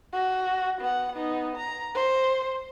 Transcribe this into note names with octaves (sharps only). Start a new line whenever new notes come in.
F#4
B3 F#5
B3 D#4
A#5
C5